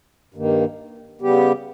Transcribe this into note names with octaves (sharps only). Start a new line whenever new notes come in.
G2 D#3 A#3
C#3 G3 B3 G4